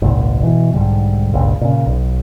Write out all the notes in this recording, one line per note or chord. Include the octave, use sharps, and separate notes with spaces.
G#1 C#2 A#2
B2 E3
B1 G#2 D3 G3
G1 C#2 A#2
A#2 C#3
B1